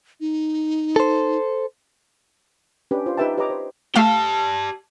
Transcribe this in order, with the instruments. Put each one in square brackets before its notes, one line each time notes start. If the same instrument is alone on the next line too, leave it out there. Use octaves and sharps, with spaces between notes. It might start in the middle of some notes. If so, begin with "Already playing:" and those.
[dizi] D#4
[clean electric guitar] A4 C5
[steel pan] C#4 D4 G4 B4
F4 C5
D#4 G4 B4 E5 G5 A5
G4 B4 C#5 D#5 A#5 D6
C5
[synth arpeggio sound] A3 F5 [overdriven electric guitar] G4 A5